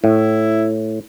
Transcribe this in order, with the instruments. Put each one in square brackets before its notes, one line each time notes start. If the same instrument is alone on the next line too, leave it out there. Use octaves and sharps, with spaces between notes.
[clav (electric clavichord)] A2 [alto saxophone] E4